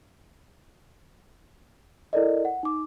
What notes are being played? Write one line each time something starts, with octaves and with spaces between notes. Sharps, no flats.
E4 A4 A#4 D5 D#5
F#5
D#4 D6